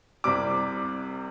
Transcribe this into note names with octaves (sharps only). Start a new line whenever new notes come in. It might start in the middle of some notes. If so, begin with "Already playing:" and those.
C2 C3 G3 D6